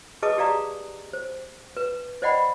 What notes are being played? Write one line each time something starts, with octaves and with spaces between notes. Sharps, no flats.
G#4 B4 D#5 A5 D6 D#6
G4 G#4 D5 F5 A#5 D#6
C5
B4
C5 D5 D#5 F#5 G5 B5